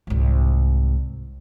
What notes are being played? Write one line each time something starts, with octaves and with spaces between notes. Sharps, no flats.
C2 G#2